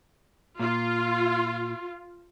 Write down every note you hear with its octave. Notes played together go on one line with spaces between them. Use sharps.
A#2 F4